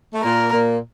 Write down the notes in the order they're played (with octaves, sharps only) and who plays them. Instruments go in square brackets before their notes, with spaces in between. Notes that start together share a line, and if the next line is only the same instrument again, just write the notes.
[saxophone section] A3
[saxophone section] A#2 A#3 [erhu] A#4
[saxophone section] A#2 A#3